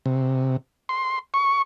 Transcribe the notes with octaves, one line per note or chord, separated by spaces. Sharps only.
C3
C6
C#6